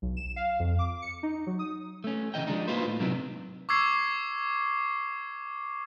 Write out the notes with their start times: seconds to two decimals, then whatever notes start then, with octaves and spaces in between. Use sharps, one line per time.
0.02 B1
0.17 E7
0.36 F5
0.59 F2
0.79 D6
1.02 C#7
1.23 D#4
1.47 F#3
1.59 D#6
2.04 A3 C#4
2.34 C#3 E3 D#5 G5
2.47 F3 G#3 D4 D#4
2.68 A#3 D#4 F4 F#4 B4 C5
2.85 A2
3.00 G#2 C3 D#3 F#3 B3 D4
3.69 C#6 D6 E6 G#6 C7